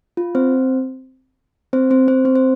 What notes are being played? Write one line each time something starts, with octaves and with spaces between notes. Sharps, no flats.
F4
C4 C5
C4 C5
C4 C5
C4 C5
C4 C5
C5